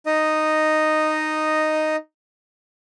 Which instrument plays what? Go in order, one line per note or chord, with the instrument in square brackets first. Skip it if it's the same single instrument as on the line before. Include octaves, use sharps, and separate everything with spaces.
[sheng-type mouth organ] D#4 D#5